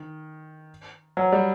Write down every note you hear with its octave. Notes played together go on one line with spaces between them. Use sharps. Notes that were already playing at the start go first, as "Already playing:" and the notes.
Already playing: D#3
F#3
G3